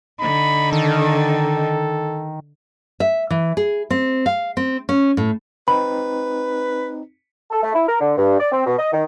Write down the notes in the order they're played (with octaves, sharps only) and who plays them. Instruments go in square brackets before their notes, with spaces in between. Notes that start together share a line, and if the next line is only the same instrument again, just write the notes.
[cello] D3 D#4 [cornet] B5
[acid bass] D#3 [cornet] A4
[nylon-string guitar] E5
E3
G#4
C4
F5
C4
C#4
A2
[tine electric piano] C4 D#4 [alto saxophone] B4 [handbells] B5
[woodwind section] A4
A3
E4
A#4
D3
G2
D5
C4
B2
D#5
D#3